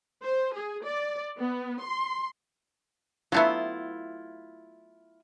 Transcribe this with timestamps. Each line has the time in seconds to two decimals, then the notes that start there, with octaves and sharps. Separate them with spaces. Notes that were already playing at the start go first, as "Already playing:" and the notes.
0.23 C5
0.54 G#4
0.85 D5
1.38 B3
1.81 C6
3.32 F#3 A3 B3 E4 F4